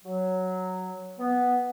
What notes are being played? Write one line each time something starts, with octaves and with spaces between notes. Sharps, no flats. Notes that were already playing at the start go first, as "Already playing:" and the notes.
F#3
B3